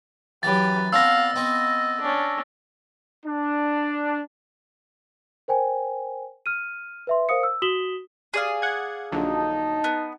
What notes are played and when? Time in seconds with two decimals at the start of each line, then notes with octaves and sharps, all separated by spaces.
0.43 F#2 E3 G4 B4 A6
0.93 B3 C4 D4 F5 E6 A#6
1.36 B3 C4 D#5
2.01 C#4 D4
3.26 D4
5.48 A#4 C5 G5 G#5
6.46 F6 D#7
7.07 B4 E5 C6
7.29 A#4 C5 F5 D#6 C#7
7.43 E6
7.62 F#4 D#6 B6 E7 F#7 G7
8.34 G#4 D5 F5
8.62 F#5 G#6
9.12 A#1 D3 F#3 D#4 A5
9.84 B3